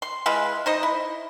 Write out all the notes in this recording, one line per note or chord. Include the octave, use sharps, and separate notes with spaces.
C6
G#3 E4 F4 B4
D#4 C5 D#5
E4